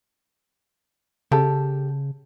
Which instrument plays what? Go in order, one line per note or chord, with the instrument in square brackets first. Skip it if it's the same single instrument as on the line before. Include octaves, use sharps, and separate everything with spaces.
[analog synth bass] C#3 [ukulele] G4 A4 A5